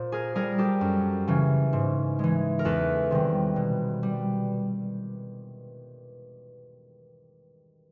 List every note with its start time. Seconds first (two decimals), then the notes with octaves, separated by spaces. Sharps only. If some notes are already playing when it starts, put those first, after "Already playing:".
Already playing: A#2 C5
0.12 G#4 A#4
0.35 G3 G#4 A#4
0.58 G4 A4
0.81 F#2
1.28 C#3 E3
1.73 G#2
2.19 E3 G#3
2.59 A#4
2.65 E2 A4 B4
3.11 C3 D#3 G3
3.56 B2
4.03 G3